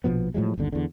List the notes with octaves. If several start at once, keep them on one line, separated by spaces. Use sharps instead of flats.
A#1 B2 F3 B3
A2 F3 F#3 G#3
G1 D#2 D3
E2 D3